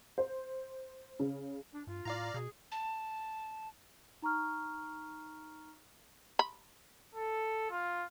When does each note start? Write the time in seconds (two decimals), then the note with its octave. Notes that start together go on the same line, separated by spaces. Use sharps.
0.18 C5
1.20 C#3
1.73 D4
1.87 G2 F4
2.05 A2 D5 F5 A#5
2.34 B2 G#4
2.72 A5
4.22 D#4 A#5 C#6 F6
6.39 B5
7.15 A4
7.71 F4